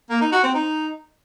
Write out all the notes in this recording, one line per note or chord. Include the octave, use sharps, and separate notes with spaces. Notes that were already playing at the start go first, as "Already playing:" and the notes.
A#3
D#4
F#4
C4
D#4